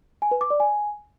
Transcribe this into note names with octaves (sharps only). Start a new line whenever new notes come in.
G#5
B4
D6
D5
G#5